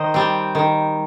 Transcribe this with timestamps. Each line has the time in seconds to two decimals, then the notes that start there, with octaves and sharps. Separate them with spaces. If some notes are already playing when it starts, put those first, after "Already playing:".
Already playing: D#3 C5 D#5
0.14 G3 C4
0.55 D#3